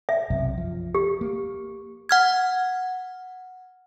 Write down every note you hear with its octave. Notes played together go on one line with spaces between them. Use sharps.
E5
B1 F#2 C3
F3
G4
A#3
F#5 F6 G#6